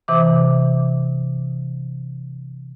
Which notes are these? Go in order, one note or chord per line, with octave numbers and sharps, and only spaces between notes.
C3 E3 D6